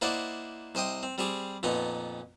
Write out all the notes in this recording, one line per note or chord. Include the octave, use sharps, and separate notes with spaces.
A#3 E4 C5 D5 D#5 F#5
C2 C5 D#5 G5 D#6
C4
G3 C4 G4 G#4
F2 A#2 B3 D#4